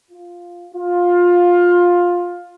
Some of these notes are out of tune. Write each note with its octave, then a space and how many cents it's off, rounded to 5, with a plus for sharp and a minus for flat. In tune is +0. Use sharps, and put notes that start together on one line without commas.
F4 +0
F4 +15